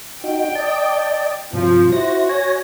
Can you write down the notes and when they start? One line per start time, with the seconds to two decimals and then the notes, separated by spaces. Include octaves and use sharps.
0.24 D#4 F#4 G5
0.55 D5 D#5 A5
1.53 G2 C3 F3
1.92 E4 F#4 C5 A#6
2.29 C#5 G#5 A#6